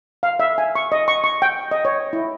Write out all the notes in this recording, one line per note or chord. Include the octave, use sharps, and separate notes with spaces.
F5
E5
G#5
C#6
D#5
C#6
C#6
G5
D#5
C#5
E4